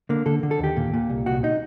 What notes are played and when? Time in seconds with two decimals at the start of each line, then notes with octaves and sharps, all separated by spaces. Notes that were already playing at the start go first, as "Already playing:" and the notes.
0.09 D3 A#3
0.26 D3 A4
0.43 D3
0.51 A4
0.59 D#2 G4
0.76 A#2
0.94 A#2
1.10 C2
1.26 C2 F#4
1.44 D#4